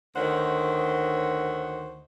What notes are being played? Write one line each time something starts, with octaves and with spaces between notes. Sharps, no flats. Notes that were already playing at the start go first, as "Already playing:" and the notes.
D2 D#3 C5 C#5 F#5